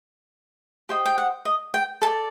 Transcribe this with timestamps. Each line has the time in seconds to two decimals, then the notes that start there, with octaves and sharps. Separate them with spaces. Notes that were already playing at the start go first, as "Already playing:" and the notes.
0.89 G4 C5 D#5 G5
1.05 G5
1.18 F#5
1.45 D#5
1.74 G5
2.02 A4 A5
2.06 D5